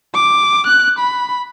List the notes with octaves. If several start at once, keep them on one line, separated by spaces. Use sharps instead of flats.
D6
F#6
B5